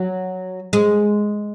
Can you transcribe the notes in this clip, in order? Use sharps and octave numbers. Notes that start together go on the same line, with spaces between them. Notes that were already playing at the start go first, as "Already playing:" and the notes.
Already playing: F#3
G#3